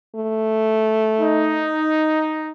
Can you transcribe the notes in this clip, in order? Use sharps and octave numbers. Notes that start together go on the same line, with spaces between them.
A3
D#4